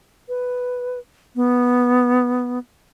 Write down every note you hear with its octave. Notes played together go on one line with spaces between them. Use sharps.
B4
B3